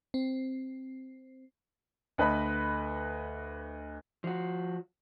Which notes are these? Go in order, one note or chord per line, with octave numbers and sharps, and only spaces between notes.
C4
D2 B4 D#5 B5
F3 F#4